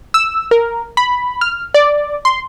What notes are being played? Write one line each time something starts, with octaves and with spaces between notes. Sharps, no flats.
E6
A#4
B5
F6
D5
C6